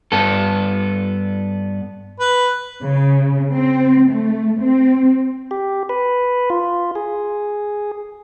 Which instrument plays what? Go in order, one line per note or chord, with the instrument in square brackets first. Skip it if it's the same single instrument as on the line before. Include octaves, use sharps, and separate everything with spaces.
[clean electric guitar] G2 B3 A4
[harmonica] B4
[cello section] C#3
C4
A3
C4
[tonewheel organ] G4
B4
F4
G#4